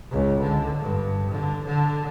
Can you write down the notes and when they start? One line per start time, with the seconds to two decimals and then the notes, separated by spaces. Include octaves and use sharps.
0.11 C#2
0.42 D3
0.81 G2
1.32 D3
1.65 D3